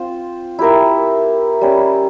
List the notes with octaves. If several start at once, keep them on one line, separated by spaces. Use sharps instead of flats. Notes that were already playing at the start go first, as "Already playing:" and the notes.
Already playing: C4 F4 C5
E4 G4 A#4 E5
G3 C#4 G4 C5